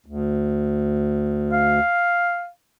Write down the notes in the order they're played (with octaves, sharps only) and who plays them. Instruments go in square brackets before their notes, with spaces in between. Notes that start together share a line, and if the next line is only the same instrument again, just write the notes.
[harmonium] D2
[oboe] F5